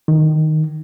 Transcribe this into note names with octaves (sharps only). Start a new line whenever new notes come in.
D#3